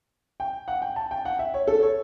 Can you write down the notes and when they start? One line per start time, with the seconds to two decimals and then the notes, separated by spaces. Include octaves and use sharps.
0.40 G5
0.68 F#5
0.82 G5
0.96 A5
1.11 G5
1.25 F#5
1.39 E5
1.54 C#5
1.67 A4
1.83 C#5